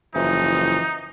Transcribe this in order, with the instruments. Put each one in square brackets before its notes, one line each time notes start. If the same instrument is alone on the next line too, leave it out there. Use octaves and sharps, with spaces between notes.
[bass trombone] F#1 [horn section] E3 F3 [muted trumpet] D#4